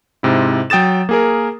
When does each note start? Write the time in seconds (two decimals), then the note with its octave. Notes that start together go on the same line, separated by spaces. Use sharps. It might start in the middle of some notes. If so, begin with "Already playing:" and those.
0.23 G#2 C3 E4
0.70 F#3 G5 D#6 A6 E7
1.09 A#3 G#4 A#4